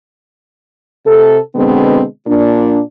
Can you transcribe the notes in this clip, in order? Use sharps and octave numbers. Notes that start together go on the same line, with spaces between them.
C3 A4
B2 D3 G#3 B3 C4
A#2 D4